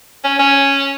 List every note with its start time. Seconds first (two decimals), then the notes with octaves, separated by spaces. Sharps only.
0.24 C#4
0.39 C#4